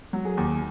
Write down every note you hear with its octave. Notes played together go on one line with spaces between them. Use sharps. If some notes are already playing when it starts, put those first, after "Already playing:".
F#3
G#4
D#2